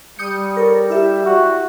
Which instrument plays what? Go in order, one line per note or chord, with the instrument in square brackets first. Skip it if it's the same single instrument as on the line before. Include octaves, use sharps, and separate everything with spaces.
[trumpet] G3 [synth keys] D#6 G6 C#7
[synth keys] A4 A#4 C#5
E4 G4 E5
[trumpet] F#4